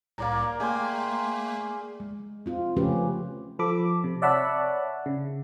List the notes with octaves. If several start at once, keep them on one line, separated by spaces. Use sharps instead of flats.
C2 A2 A#3 D5 A#5
A3 A#3 G#4 G5 C6
G#3
C4 F4
C#3 F3 A3 C#4 G4 B4
F3 A4 B5 D6
C3
C#5 D5 E5 F#5 A5 B5
C#3